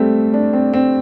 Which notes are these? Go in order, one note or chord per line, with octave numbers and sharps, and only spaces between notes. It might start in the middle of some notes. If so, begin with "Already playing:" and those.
Already playing: G3 A3 C4
D4
C4
C4